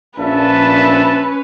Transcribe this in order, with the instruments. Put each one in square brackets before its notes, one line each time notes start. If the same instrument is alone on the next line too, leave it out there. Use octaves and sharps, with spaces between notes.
[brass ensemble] A#1 E5 A5 [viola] C#4 B4